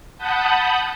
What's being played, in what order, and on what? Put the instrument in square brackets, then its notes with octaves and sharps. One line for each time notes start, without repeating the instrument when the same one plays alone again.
[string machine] F#5 A5 B5 D#6 F#6 G6